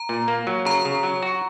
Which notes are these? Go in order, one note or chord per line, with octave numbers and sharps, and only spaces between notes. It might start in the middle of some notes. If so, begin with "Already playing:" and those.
Already playing: A#5
A#2
A#3
F#3
C#3 A#5
C#3
F#3
F#4